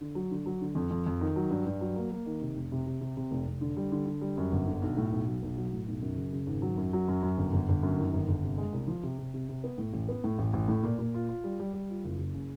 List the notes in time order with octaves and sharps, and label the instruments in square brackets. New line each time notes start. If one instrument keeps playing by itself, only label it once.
[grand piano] D3
F#3
D3
F#3
D3
F2
F2
F2
D#3
F#3
G2
G2
F#3
A#3
A#3
D#3
C3
F1
C3
C3
C3
C3
F1
F1
D3
G3
D3
D3
G3
F#2
G1
D3
B1
A2
B1
F#3
B1
F#3
A2
B1
F#2
C#3
C#3
G#1
F#3
F#2
F#3
F#2
F#2
G1
G1
G1
F#2
D#3
G1
G1
C3
G#3
C2
F3
C3
C3
C3
C3
B3
A2
A1
B3
A2
A1
A1
A2
A#2
A#2
F4
F4
G3
G3
G3
F4
F#1
F#1
C#3